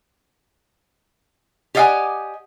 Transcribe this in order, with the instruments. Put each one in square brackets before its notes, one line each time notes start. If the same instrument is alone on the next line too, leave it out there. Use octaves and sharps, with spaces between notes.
[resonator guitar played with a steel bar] G4 D5 D#5 F5 F#5 G#5